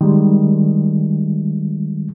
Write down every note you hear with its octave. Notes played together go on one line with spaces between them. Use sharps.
D#3 G3 G#3